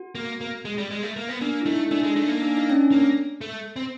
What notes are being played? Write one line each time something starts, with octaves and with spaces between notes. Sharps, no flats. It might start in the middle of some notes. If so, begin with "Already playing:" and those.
Already playing: F#4
A#3
A#3
G#3
G3
G#3
A3
A#3
B3
A#3 D4
E4
A3 D#4
A3 D4
G#3
A3 D#4
A#3
D4
D#4
C#4
D4
A#3
A3
C4